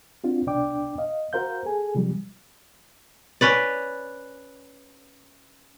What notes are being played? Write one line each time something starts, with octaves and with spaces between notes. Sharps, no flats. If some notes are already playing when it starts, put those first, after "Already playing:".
C4 D4 F4 F#4
C2 B2 D4 D5 G5 D6
D#5 F5
F#4 A#4 C5 F5 G6
G#4 A4 G#5
C3 F3 G3
C#4 B4 D5